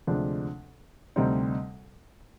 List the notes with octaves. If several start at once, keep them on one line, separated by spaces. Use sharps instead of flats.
D2 C3 F3 G#3 D4
D2 C3 G3 C4 D#4